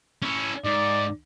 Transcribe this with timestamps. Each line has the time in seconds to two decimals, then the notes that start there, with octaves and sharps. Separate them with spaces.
0.22 C#4 E4
0.65 G#2 D5